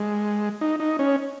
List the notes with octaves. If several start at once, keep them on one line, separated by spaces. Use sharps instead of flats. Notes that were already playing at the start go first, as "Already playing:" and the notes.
Already playing: G#3
D#4
D#4
C#4